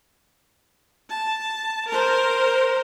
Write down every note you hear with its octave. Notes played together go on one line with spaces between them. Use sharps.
A5
A#4 C5